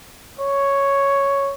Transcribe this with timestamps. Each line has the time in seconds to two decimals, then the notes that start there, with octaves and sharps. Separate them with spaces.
0.40 C#5